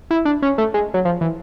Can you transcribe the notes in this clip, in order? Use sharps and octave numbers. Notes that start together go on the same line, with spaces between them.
E4
D4
C#4
A3
G#3
F#3
F3
E3